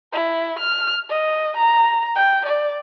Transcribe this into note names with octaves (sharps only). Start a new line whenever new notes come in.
E4
F6
D#5
A#5
G5
D5